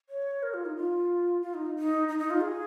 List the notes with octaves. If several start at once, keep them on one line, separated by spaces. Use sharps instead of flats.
C#5
A#4
F4
D#4
F4
F4
D#4
D#4
D#4
D#4
F4
G#4